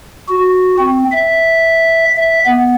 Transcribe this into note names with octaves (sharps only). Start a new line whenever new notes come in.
F#4
C4
E5
E5
B3